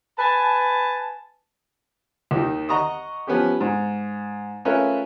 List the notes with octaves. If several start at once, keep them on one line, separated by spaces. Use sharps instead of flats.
B4 G#5 A5
D#2 D#3
D#5 F#5 A#5 C#6 D#6
F3 B3 C#4 G4
G#2
A3 C#4 F4 A#4 B4